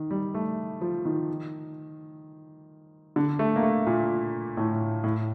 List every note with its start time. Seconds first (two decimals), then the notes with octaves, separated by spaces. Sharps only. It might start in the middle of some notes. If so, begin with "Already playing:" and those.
Already playing: D#3
0.11 G3
0.34 A3
0.81 F3
1.05 D#3
3.16 D3
3.39 A3
3.56 A#3
3.63 A3
3.86 A#2
4.57 A2
5.04 A2